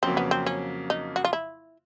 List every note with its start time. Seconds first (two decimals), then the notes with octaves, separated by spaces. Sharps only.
0.03 F2 C#3 F#3 A#3 C4
0.17 B3
0.31 C4
0.46 C#4
0.90 D#4
1.16 F#4
1.25 F4
1.33 E4